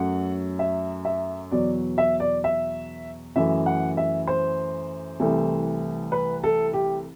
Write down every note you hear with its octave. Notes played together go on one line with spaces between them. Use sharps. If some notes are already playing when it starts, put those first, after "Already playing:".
Already playing: F#2 F#3 A3 F#5
E5
E5
E2 B2 F#3 D5
E5
D5
E5
F#2 E3 A3 E5
F#5
E5
C5
C2 C3 E3 A3
B4
A4
G4